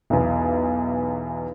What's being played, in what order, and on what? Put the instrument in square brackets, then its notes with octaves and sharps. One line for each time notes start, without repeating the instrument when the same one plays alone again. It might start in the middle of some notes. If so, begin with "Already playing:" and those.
[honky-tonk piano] B1 E2